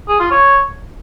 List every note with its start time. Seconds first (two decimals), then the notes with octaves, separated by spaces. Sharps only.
0.08 G#4
0.20 F4
0.31 C#5